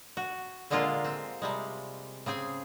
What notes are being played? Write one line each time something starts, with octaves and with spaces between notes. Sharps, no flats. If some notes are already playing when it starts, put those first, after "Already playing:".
F#4
A#2 D3 G#3 A#3 F4 A4
C4
C3 G3 G#3
C#3 C4 G#4 G#5